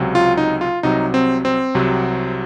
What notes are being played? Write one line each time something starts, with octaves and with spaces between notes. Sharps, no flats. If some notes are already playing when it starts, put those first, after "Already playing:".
Already playing: C#2 C3 F#3
F4
D#4
F4
C2 C3 F#3 D#4
C4
C4
C2 C3 F#3